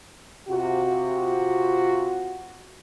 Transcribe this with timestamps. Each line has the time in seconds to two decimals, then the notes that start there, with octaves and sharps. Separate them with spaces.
0.49 C3 F4 F#4